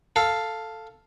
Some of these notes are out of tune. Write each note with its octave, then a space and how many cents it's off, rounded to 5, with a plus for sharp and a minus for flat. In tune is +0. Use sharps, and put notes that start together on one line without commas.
A4 +5 F5 +0